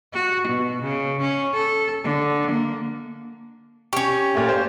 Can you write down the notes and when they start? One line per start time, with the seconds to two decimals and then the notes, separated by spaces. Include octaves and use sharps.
0.13 F#4
0.47 B2
0.82 C#3
1.21 C#4
1.54 A4
2.04 D3
2.51 A#3
3.93 C#4 G4 C#6
4.35 A#2 A3
4.49 C5